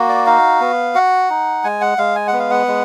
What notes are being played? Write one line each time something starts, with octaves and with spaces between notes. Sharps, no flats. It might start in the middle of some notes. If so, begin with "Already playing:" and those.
Already playing: A#3 F#4
D5
D#4 F5
B3
F#4 F#5
D#4
G#3 G#5
F#5
G#3 F5
G#5
F#5
B3
F5
F#5
G#3